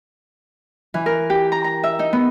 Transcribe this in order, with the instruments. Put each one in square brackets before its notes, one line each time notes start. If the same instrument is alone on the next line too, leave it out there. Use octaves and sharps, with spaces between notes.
[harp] E3
A#4
G4
A#5
A#5
E5
D#4
B3